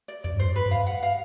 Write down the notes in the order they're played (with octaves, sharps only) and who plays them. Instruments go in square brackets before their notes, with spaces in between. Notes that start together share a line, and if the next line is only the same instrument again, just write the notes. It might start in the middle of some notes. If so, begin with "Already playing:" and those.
[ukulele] D5
[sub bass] F2 [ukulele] D5
[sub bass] G2
[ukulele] C5
[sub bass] F#2
[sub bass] G2 [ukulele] B4
[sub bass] G2
[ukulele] F5
F#5
F5